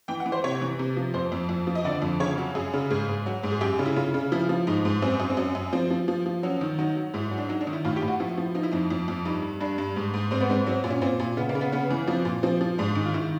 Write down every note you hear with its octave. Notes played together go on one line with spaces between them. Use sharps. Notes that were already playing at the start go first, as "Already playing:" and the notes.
E3 G5
F#5
E3
C5
C3 C#5
E3
C3
F3
F2 C5
F2
F2
F3
D#5
D3 D5
F2
C#3 C#5
F#3
F#2 G#4
C#3
G#2 G#4
G#2
F#3
G#2
G#4
F#2 G4
C#3
E4
C#3 F4
C#3
F3 E4
F3
G#2 D#4
G#2
F#2 C4
F#2
C4
F#2 C#4
F#2
F3 C4
F3
F3
F3
F#3 C#4
D#3
F#3 D#4
F#3
G#2 E4
F#3
D4
F#3 D#4
D4
D#3
E4
A2 F4
G4
A2
F#4
F3 E4
F3
F3 D#4
E4
F2 D#4
F2
F2
G2 D#4
G2
G2 D4
G2
G#2
G#2
G#2 C4
B3
G#2 C4
F#3 C4
A#2
C#4
A#2 C4
A#2
C#3 B3
A#3
C#3
B3
C#3 B3
E3
F3 C4
A#2
F3 C4
F3
G#2 D4
D#3
F4
D#3 E4